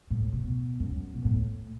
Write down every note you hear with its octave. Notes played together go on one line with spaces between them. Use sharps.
A2
B2
F#2
B2
A2